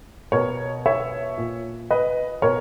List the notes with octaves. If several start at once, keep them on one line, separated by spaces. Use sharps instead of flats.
B2 A#4 C#5
C#5 E5
A#2
B4 D#5
B2 A#4 C#5